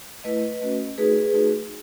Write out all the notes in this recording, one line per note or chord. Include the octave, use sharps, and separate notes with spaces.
A3 E4 B4 D#5
A3 C#4 F#4
A3 D#4 F#4 G#4 B4
A3 D#4 F#4